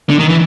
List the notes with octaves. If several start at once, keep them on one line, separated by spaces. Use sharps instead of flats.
D3
D#3
E3